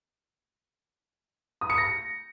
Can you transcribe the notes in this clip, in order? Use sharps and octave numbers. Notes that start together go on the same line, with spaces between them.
D#6
C#7
A#6